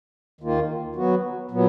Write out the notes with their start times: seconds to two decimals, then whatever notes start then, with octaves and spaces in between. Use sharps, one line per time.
0.41 D#2 D#3 A#3 F4
0.95 F#3 B3 F#4
1.51 A#2 F#3 B3